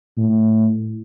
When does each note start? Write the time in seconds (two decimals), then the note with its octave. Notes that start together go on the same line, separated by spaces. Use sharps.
0.17 A2